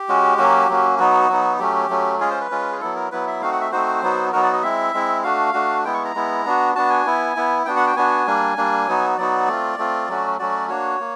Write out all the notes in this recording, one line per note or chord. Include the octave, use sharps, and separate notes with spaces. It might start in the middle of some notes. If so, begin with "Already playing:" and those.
Already playing: G4
G#3 C#4 F#4
F#3 A#3 C#4 F#4
F#3 A#3 C#4 F#4
F#3 B3 D#4 F#4
F#3 B3 D#4
F#3 A3 C#4 G4
F#3 A3 C#4
G#3 C#4 F4 G#4
C5
B4
G#3 C#4 F4
G#4
F#3 B3 E4 A4
A#4
F#3 B3 E4 B4
E5
A3 C4 D#4 F#4 F5
F#5
E5
A3 C4 D#4 F#4 C5
F#3 B3 D#4 F#4
F#3 B3 D#4 F#4 A#4
D5
D#5
G#3 C4 E4 E5
G#3 C4 E4
A3 D4 F#4 F5
A3 D4 F#4
G#3 B3 E4 G5
C#6
A#5
G#3 B3 E4
B3 D4 F#4
B3 D4 F#4 A5
G#5
B3 E4
B3 E4
B3 D4 F#4 G5
F#5
G5
B3 D4 F#4 G#5
G3 A#3 D4
G3 A#3 D4
F#3 B3 D#4 F#4
F#3 B3 D#4 F#4 D5
A3 C4 F4
A3 C4 F4
F#3 A3 C#4 F#4
F#3 A3 C#4 F#4 D5
A#3 D4 F#4 C#5
A#3